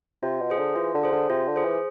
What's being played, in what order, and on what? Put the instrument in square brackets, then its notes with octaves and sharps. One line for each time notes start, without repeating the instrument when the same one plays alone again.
[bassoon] C3 [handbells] F4
[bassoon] B2
[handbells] G#4 C5
[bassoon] D3
[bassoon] E3 [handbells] F4
[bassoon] D3
[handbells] G#4 C5
[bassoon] D3
[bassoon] C3 [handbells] F4
[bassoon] D3
[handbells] G#4 C5
[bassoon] E3